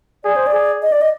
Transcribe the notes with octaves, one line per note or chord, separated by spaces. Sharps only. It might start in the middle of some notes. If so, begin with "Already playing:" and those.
G#4 D5
C5
D5
G#4
D#5
D5
D#5